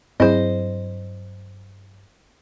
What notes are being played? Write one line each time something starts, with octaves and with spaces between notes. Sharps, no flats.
G2 F#3 C4 E4 G#4 C5 D#5